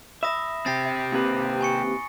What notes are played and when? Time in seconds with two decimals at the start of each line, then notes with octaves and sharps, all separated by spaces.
0.23 E5 B5 D#6 A#6
0.66 C4 G4 A6 A#6 C7
1.12 D#2 C3 B4
1.61 G#5 C#6 C#7